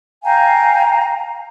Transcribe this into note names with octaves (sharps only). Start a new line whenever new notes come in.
F5 G5 G#5 A#5